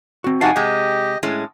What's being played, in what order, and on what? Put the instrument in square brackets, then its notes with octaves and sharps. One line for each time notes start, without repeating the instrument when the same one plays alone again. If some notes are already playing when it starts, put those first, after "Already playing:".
[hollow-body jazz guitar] C4 F#4
[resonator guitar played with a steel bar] F2 D#4 [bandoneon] C3 F#4 A5 [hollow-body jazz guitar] F5 F#5 G#5
[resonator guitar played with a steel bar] C3 G#3 [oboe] G4 [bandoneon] D#5
[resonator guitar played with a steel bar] A2 G#3 C#4